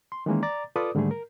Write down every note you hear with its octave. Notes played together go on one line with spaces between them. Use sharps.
C6
D#3 E3 G#3 A#3 C#4
D5 A#5 D6 A6
F4 A4 B4 D5 D6 D#6
G#2 D3 D#3 G3 A3 G#4
A#4